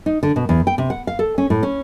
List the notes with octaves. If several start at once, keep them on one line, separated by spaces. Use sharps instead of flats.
D#4
D3
B2
E2
G5
C3
F#5
F5
A4
C#4
A2
C#4